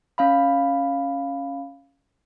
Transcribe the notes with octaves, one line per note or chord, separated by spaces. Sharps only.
C#4 F5 B5